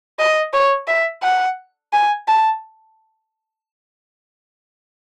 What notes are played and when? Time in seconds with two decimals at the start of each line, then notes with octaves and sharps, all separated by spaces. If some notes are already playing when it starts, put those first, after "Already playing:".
0.19 D#5
0.53 C#5
0.88 E5
1.23 F#5
1.93 G#5
2.28 A5